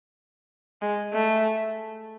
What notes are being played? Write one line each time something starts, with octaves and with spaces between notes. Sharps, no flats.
G#3
A3